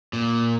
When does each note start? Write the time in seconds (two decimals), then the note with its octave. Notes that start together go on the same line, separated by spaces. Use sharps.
0.13 A#2